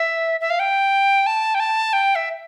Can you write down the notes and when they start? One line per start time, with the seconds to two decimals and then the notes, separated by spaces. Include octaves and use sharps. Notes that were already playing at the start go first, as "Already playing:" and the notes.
Already playing: E5
0.41 E5
0.50 F5
0.60 G5
1.27 A5
1.55 G5
1.60 A5
1.93 G5
2.15 E5